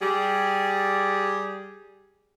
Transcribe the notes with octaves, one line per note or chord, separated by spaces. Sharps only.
G3 G4 G#4